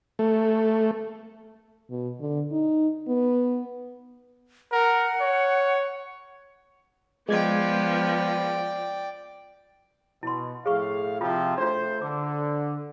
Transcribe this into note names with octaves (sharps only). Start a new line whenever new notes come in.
A3
B2
D3
D#4
B3
A#4 F#5
C#5
F3 G#3 B3 D5 G5 G#6
B2 E4 C6
A2 G#4 F5 C#6
C3 F3 C4 F4
A3 D4 F4 C5
D3 D6